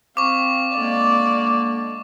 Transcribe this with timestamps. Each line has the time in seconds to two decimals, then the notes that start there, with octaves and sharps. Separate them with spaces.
0.17 C4 F5 C#6 D6
0.76 D3 G#3 A#3 D5